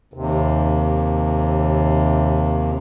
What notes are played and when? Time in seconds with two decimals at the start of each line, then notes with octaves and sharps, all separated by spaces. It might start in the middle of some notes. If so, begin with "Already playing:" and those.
0.14 D#2 C3